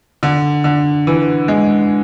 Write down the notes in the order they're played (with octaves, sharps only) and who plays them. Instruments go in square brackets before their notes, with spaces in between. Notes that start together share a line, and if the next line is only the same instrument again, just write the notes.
[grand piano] D3
D3
E3
G#3